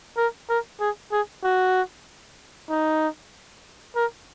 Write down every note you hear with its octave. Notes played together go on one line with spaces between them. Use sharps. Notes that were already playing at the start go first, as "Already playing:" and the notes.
A#4
A#4
G#4
G#4
F#4
D#4
A#4